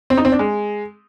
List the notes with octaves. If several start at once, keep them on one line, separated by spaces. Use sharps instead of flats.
C4
D#4
C4
D4
G#3